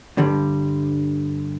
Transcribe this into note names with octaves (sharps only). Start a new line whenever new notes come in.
G2 D3 G3